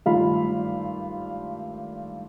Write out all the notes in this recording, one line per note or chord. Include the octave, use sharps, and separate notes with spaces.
G#1 G2 A3 F4 F5 B5